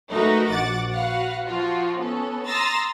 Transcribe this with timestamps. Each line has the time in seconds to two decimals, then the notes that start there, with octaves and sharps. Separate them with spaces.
0.11 A3 D#4 F#4 A#4 B4
0.48 A#1 F#4 F#5 D6 A6
0.93 F#4 B4 F5 F#5
1.45 F3 F4 F#4
1.98 B3 C#4 A4
2.47 A#5 C6 D#6 E6 A6 A#6